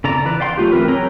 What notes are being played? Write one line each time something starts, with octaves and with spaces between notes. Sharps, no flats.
C#3 A4 D5 A#5
E3 B4 D5
D5 F5 G5 C6
F#3 A3 F4 G4
E3 C4 A#4 B4
F#3 G#4 C#5 G5 A#5